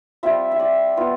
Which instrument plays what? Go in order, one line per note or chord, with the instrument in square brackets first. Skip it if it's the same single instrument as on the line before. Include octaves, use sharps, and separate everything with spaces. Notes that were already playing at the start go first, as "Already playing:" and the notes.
[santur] G3 C4 F4 E5
E5
D5
B3 F4